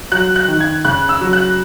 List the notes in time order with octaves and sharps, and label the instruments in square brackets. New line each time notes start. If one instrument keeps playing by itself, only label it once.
[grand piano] F#3 F#6
F#6
D#3
G#6
C#3 F#6
E6
F#3
F#6